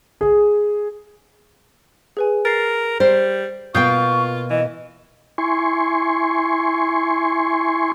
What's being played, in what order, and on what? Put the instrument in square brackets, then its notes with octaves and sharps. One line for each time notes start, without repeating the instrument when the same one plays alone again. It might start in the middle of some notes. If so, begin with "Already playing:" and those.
[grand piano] G#4
[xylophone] G#4 B4 G#5
[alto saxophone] A#4 [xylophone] A6 C7
[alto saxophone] G3 [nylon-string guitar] C5
[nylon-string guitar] B2 A#3 G5 [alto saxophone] F4 [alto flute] C#6 [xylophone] D#6 G6 C7
[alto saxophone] E3 [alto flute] D#5
[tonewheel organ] E4 G#5 C6 C#6